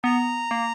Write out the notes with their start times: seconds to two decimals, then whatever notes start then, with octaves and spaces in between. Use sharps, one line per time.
0.04 B3 A#5
0.51 A#3